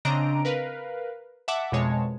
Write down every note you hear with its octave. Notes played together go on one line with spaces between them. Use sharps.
C#3 C4 D4 D#5 A#5 D7
A#4 B4 F5
E5 F#5 A5 D6
F2 B2 G#3 C#5 A5